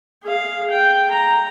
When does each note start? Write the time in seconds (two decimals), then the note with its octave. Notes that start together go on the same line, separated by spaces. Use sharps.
0.23 G#4 F5
0.71 G5
1.11 A#5